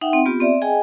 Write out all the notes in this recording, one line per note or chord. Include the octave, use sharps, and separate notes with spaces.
D#4 E5 F#5 G5
C4
B3 F4 G4
C4 D5 E5
G#4 D#5 G5 G#5